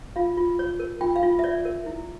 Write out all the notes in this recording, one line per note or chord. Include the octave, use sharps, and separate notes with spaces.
F4 F5
F4
C#5
A#4
F4 G5
F5
F4
E5
C#5 D5
A#4
E4